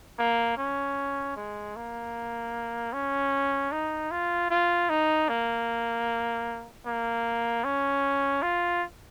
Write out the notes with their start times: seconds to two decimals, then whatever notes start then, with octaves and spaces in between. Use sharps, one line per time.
0.19 A#3
0.58 C#4
1.36 G#3
1.76 A#3
2.93 C#4
3.72 D#4
4.11 F4
4.50 F4
4.89 D#4
5.29 A#3
6.86 A#3
7.64 C#4
8.43 F4